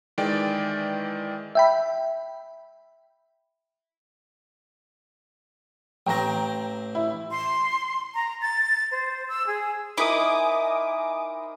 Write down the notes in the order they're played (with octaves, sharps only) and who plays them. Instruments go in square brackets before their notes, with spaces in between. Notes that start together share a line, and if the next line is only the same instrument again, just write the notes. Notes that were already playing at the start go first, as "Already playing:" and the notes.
[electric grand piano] D#3 E3 G#3 D5 G5 A6
[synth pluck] E5 G5 B5
[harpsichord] A1 C4 [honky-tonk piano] G5 A#5 A#6
[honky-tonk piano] E4
[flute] C6
A#5
A6
C5
E6
G#4
[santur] D#4 A#4 C5 [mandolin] E4 [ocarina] G#5 [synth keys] D6 D#6